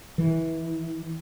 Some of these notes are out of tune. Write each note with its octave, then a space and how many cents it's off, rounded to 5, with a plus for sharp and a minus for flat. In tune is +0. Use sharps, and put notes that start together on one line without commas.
E3 -20